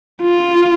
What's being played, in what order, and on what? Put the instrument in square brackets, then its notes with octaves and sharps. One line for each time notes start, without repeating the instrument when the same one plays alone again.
[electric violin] F4